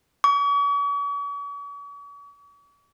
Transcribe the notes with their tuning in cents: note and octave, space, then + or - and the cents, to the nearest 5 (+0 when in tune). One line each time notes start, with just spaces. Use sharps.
C#6 +45